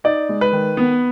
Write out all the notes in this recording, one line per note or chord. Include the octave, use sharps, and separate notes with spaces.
D#4 D5
G#3
B4
D#3
B3